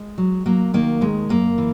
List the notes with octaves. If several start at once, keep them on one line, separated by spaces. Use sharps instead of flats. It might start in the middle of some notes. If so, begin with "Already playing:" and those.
Already playing: G#3
F#3
F#3 A#3
D#3 A#3
D#2 G#3
F#2 A#3
E3